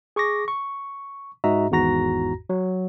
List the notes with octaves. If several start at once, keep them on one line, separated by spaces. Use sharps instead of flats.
G#4 C#6 D6 A#6
C#6
G#2 F#4 D#5 E5 A#5
G#1 E2 G#2 F#4 A#5 A#6
F#3